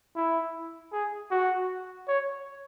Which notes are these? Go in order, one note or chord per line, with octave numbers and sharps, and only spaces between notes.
E4
G#4
F#4
C#5